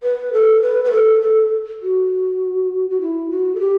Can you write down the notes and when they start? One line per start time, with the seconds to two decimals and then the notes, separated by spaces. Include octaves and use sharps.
0.03 B4
0.33 A4
0.62 B4
0.84 B4
0.92 A4
1.22 A4
1.82 F#4
2.90 F#4
3.01 E4
3.30 F#4
3.55 A4
3.60 G4